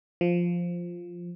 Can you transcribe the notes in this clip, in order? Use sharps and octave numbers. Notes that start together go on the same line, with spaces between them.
F3